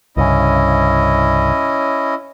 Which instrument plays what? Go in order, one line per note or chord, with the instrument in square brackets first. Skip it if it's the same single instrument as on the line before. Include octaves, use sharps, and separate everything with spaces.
[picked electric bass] C2 G2 C#3 [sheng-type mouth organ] C#4 E4 D#5